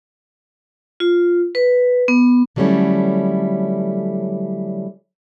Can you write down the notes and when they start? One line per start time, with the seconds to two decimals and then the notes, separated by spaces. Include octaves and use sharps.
1.00 F4
1.55 B4
2.08 B3
2.56 D3 F#3 G3 A3 C#4 E4